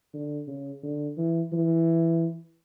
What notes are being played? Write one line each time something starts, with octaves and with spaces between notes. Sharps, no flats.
D3
C#3
D3
E3
E3